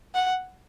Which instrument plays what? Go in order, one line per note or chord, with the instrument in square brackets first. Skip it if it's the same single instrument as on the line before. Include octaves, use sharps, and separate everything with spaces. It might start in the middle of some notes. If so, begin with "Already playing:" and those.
[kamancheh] F#5